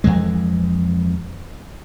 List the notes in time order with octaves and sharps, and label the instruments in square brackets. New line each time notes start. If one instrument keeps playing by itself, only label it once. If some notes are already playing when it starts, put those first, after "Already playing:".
[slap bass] F2 E3 G#3